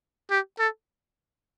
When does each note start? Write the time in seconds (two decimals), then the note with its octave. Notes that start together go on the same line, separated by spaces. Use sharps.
0.31 G4
0.59 A4